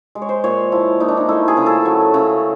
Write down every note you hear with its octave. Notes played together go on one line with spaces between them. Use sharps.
G#3
C#5
C5
A#2 C#5
F3 E4
A#2 D#4
D4
D#4
A3 E4
G#4
C#3
A4
F#3
C#3